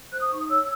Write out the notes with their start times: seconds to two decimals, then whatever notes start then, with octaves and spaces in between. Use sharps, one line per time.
0.13 C5 F#6
0.21 D#6
0.30 D#4 C#6
0.40 D#6
0.49 C#5 E6